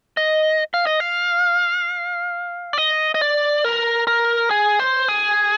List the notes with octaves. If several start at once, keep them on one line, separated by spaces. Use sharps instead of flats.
D#5
F5
D#5
F5
D5
D#5
D#5
D5
A#4
A#4
G#4
C5
G#4